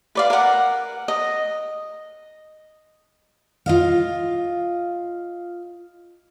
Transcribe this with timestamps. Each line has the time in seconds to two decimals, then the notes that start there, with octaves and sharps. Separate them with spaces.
0.15 B4 D5 F5
0.30 A#4 F#5
1.08 D#5
3.66 F4 D#5 F5